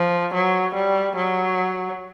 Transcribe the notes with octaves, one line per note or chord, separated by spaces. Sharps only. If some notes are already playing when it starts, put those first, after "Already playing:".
Already playing: F3
F#3
G3
F#3